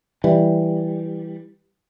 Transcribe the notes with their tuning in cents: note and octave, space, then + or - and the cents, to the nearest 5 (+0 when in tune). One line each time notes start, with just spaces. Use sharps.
E3 +0 G3 +0